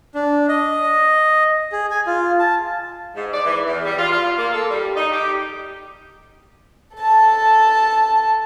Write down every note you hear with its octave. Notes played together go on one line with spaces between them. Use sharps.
D4
D#5
G#4
G#5
F4
A5
G#2
D5
E3
E2
G3
F4
F4
A#3
A4
G3
D#4
G4
A4 A5